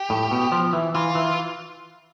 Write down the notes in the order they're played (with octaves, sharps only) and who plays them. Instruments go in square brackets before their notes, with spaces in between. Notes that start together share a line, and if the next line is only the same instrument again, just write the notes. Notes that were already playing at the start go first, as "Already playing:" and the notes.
Already playing: [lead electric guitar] G4
[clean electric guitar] A2
B2
F3
E3
[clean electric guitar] E3 [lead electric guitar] F4
[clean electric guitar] E3